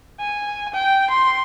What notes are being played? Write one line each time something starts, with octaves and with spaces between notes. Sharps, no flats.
G#5
G5
C6